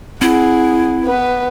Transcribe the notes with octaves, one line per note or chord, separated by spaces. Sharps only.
C4 E4 G#4 F#5
B3 B4